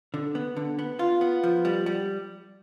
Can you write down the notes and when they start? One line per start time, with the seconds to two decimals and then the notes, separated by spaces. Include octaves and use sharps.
0.14 D3
0.35 B3
0.56 D3
0.79 B3
0.99 F4
1.21 B3
1.44 F3
1.65 G3
1.86 G3